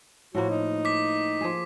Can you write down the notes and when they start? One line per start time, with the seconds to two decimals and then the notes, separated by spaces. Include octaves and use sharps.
0.35 A2 F3 A#3 F#4
0.50 D#4
0.85 D6 B6
1.41 F3 G#4